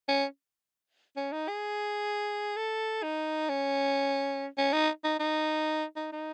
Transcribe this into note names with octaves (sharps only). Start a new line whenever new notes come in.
C#4
C#4
D#4
G#4
A4
D#4
C#4
C#4
D#4
D#4
D#4
D#4
D#4